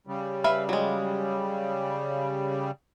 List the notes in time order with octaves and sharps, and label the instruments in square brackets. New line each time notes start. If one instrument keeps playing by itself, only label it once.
[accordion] C#3 G3
[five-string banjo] B4 E5 F5
F#3 G#3